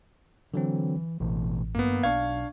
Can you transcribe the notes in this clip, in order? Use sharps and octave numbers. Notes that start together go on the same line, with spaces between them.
D3 E3 F#3 C4
A1 B2 E3 A3
F#1 G2 F#3 A#3 B3
B1 D4 F5 C#6 G#6